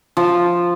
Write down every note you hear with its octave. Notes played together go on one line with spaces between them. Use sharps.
F3